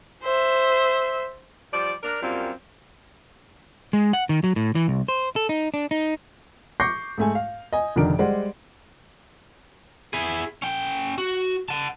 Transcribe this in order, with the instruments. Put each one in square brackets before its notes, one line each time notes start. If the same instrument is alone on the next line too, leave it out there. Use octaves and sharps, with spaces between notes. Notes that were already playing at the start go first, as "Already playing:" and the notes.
[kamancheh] C5 E5
[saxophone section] F3 G3 D5
D4 A#4
F#2 G3 A#3 C4 F4
[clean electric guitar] G#3
F#5
D#3
F#3
A2
E3
C2
C5
A4
D#4
D4
D#4
[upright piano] C#6 D6 G6 A#6 C7 C#7
G#2 A3 G#5
F5
D#5 G#5
F1 D3 D#3 D4 A#4 D7
G3 G#3 C5 D5 F#5
[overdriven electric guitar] E4 G#4
C#4 G5
F#4
F#5 A5